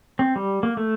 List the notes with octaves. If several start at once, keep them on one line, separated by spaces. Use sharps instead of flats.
C4
G3
A#3
A3